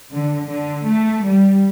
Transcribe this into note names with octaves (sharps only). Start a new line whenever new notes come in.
D3
D3
A3
G3